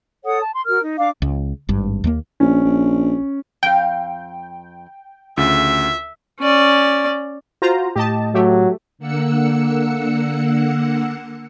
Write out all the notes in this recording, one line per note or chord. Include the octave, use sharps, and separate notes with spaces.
A4 C#5 F#5 D#6
A5
C6
F#4 A#4 F6
D#4
D4 F5 D6
C#2
G#1 G2
D#2 G#3 A#3
A#1 C#4
A#1
F2 F5 G5
D2 C#3 F4 E5
C#4 D5
F4 F#4 C5 A#5
A2 G4 D#5 A5
F#3 A3 G4
D3 A#3 F#5 E6 C#7